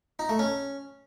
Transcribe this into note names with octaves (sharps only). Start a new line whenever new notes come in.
D#4
A3
C#4